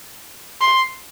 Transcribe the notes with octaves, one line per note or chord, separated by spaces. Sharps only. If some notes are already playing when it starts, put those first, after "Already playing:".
C6